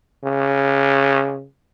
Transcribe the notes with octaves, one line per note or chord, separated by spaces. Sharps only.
C#3